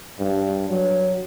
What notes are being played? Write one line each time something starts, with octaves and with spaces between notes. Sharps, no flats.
G2
F#3